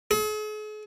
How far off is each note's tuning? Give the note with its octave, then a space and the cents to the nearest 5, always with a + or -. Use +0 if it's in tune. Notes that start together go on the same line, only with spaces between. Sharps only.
G#4 +45